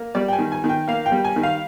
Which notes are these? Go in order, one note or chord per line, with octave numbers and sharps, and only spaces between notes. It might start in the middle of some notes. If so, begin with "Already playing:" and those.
Already playing: A#3
G3 D5
G5
G#5
D#3
G#5
D#3
G5
A#3 F5
G5
G3
G#5
D#3
F5